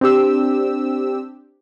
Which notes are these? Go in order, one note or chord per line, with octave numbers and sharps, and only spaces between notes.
C4 D4 G4 E6